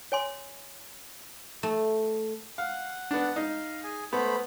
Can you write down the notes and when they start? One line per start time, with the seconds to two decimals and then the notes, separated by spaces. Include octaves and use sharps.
0.12 C#5 G#5 C6
1.63 A3
2.58 F5 F#5
3.11 B3 D4 F#5
3.36 D#4 F5
3.84 G#4 G#5
4.13 A3 B3 C5 B5